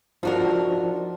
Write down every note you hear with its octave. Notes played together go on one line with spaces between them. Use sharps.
F3 D4 D#4 F#4 A#4